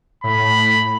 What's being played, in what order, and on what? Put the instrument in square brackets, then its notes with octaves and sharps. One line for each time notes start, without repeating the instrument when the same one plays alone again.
[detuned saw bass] A2 [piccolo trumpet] B5